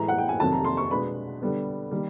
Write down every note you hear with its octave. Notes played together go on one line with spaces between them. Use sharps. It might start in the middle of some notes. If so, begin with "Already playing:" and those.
Already playing: A2 E3 G#3 A#5
F#5
G5
G#5
F2 C3 D#3 F#3 A5
A#5
C6
C#6
B2 G#3 B3 D4 B5
D3 G3 B3
D#3 G3 A#3